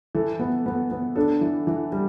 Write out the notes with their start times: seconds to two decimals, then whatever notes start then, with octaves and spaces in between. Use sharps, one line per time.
0.15 E3 A4
0.39 B3
0.66 B3
0.91 B3
1.16 D4 A4
1.41 E3
1.67 E3
1.92 G3